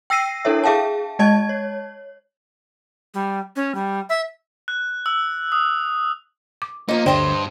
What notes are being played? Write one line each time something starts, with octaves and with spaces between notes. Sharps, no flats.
G5 E6 A#6 C7 D#7
D4 E4 A4 A#4 C#5 E5
G#4 E5 F5 G5 A5
G#3 D#5 A5 G#6
C#5
G3
C#4
G3
E5
F#6
E6
D#6
D6
F3 A#3 D#4
D2 G2 D3 C5 D5 D#5 G5